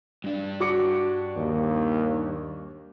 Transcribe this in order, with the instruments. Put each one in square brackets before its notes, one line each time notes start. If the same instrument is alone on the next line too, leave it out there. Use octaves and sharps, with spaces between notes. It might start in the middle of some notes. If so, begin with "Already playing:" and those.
[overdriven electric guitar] G2 D4
[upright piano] F#4 D6 C#7
[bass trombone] D#2